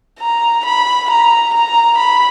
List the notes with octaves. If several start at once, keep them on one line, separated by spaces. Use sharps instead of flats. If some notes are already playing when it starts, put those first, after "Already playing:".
A#5
B5
A#5
A#5
B5